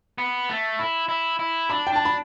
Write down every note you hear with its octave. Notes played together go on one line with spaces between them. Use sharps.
B3
A3
E4
E4
E4
D4 B5
G5
D4 A5
B5